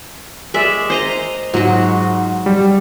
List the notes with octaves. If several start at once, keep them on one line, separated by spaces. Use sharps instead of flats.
G#3 D5 E5
C5 D#5 A#5
G#2 F#3 G#3 F#4
G3